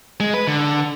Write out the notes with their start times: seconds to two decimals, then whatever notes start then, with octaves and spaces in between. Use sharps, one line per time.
0.20 G#3
0.34 B4
0.47 D3